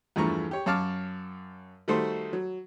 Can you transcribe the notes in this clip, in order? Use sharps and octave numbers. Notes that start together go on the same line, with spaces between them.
E2 G2 F3 A3 A#5 C#6
G4 C#5
F#2 C#5 F5 A5 D6 F6
D#3 G3 A3 F#4 A4 C5
F#3